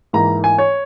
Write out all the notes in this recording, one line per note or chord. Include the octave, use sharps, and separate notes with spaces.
G#2 E3 A#3 A#5
G#5
C#5